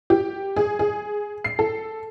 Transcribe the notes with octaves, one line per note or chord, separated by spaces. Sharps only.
G4
G#4
G#4
C7
A4